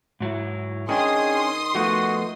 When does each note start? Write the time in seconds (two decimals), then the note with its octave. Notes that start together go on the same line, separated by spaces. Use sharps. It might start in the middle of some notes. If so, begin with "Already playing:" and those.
0.20 G#2 F#3 E4
0.89 D#3 C#4 D4 G#4 C6 D#6
1.75 F3 A3 B3 F#4